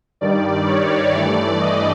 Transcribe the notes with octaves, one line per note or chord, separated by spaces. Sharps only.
G2 D#3 G3 D5
C#5
G2 E3 A3 D5
D#5